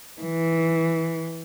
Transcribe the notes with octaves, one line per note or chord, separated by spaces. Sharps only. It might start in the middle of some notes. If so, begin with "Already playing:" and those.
E3